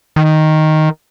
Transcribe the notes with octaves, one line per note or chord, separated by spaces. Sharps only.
D#3